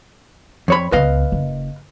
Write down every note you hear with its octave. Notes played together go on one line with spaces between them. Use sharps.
F2 C#5 B5
C#2 B3 B4 D#5 F5
F#1